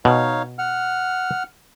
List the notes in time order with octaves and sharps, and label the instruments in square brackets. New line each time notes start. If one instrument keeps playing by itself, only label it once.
[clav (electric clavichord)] B2 [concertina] D#4 C#5 F5
[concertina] F#5 F6